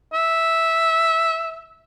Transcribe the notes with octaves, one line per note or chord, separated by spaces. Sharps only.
E5